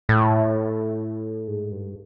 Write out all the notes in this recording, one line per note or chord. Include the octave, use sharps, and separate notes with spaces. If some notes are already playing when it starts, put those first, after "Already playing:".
A2
G#2
G2